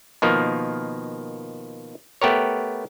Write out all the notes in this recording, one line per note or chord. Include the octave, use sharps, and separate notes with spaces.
B2 D#3 F3 A#3
A3 B3 G4 A#4 C#5